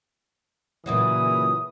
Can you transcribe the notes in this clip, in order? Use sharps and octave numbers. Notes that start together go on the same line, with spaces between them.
A#2 C#3 E3 F#3 D#6